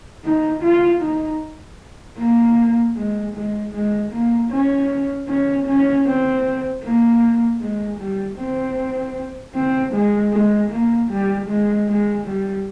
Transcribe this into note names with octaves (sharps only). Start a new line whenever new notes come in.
D#4
F4
D#4
A#3
G#3
G#3
G#3
A#3
C#4
C#4
C#4
C4
A#3
G#3
G3
C4
C4
G#3
G#3
A#3
G3
G#3
G#3
G3